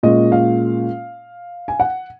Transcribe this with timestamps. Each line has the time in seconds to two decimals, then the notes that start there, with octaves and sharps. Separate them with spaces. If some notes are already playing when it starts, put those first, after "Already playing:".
0.03 A#2 G#3 C#4 F4 D#5
0.32 F5
1.68 G#5
1.80 F#5